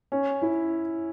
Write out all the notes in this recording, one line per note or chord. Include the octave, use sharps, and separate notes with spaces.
C#4
E4